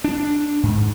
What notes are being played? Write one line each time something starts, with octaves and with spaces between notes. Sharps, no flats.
D4
G#2